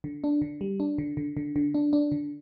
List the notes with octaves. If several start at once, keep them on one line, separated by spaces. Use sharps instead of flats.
D3
D4
D3
G3
D4
D3
D3
D3
D3
D4
D4
D3